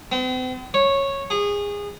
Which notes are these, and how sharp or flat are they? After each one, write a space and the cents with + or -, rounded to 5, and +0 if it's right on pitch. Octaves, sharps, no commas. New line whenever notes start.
C4 -45
C#5 -10
G#4 -25